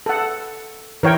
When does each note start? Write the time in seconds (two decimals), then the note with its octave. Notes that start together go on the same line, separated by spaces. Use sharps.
0.06 A4 F#5
1.03 E3 E4 A#4 C#5 G5